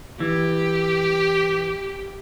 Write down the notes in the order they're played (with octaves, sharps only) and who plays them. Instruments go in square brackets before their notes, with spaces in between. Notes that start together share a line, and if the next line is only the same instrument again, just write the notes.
[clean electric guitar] E3 [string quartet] G4